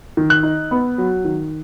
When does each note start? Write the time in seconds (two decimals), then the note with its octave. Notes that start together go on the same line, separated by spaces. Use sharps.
0.17 D#3
0.30 F#6
0.43 D#4
0.71 B3
0.98 F#3
1.25 D#3